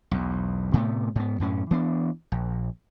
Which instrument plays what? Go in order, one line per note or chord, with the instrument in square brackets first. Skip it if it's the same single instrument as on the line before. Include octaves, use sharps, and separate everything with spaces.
[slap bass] B1 E2
A2 C3 A3 B3
G#2 B3
F#2 A2 C#4
E3 B3 D4
A#1